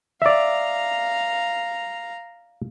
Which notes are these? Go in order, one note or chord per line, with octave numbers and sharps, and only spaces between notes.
D5 E5 F5 A#5